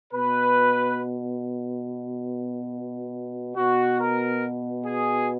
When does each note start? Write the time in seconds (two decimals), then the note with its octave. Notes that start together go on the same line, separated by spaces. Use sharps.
0.13 B2 B4
3.57 B2 F#4
4.00 A#4
4.86 G#4